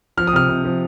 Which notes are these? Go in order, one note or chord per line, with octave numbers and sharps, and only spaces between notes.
F3 F6
D#6
C3 F6
C3
F3